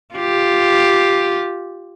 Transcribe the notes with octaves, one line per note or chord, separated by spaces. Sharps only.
F4 G4